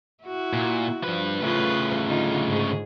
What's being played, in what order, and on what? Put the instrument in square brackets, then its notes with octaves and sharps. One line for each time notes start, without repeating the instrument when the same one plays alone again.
[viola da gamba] E4 F#4
[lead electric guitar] A#2
[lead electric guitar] G2 B4 [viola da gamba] F3
[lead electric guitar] A2 C#3 [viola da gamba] F4 B4
[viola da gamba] D3 D#4 F4
G#2 G#4